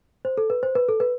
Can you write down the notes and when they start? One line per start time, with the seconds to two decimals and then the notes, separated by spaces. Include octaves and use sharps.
0.25 C5
0.38 A4
0.50 B4
0.63 C5
0.75 B4
0.89 A4
1.00 B4